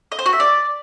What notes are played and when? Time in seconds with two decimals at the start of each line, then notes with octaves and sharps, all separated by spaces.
0.12 D#5
0.19 C5
0.26 F#4
0.33 E5
0.40 D5